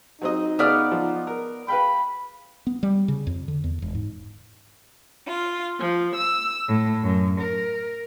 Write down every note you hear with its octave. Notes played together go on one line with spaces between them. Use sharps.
F#3 C4 D#4 D#5
C#3 B3 D5 F6
F3
A#4
B4 F5 G5 B5
B3
G3
C#3
F2
D3
E2
E1
G#2
F4
F3
E6
A2
F#2
A#4